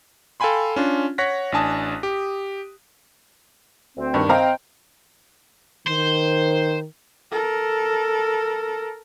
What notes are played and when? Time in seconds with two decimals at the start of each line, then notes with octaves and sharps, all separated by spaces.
0.40 A4 F5 G5 G#5 B5 C6
0.76 C#4 D4 F4
1.18 C#5 F#5 C#6 F#6 A#6 B6
1.52 A1 D4 G#5 A5 D#6
2.03 G4
3.97 D2 C4
4.14 G2 D#3 C#6
4.29 C4 C5 D#5 F5 G5 A#5
5.88 D#3 C5
7.31 A4 A#4